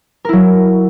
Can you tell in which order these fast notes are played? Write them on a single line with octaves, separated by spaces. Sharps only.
A#4 E4 F#3